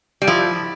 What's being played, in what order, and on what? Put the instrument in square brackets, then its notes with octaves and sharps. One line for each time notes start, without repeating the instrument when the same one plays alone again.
[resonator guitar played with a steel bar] G3
[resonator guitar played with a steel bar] F3 [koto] E4